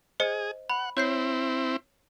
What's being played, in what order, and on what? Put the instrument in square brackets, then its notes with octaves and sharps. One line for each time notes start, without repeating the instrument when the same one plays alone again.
[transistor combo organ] G#4 [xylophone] C5 D#5 C#7
[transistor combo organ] F#5 [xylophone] B5
[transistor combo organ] C4 E4 [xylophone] C#5 G6 C7